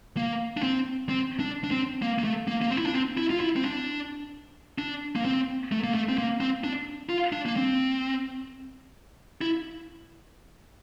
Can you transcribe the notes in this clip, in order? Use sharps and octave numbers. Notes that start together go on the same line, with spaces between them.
A#3
D4
C4
C4
D4
D4
C4
A#3
A#3
A3
A#3
A#3
C4
E4
D4
C4
E4
F4
E4
C4
D4
D4
A#3
C4
A3
A#3
A3
C4
A#3
C4
D4
F4
D4
A#3
C4
E4